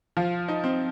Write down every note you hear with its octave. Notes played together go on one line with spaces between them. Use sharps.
F3 F4
D#4
C4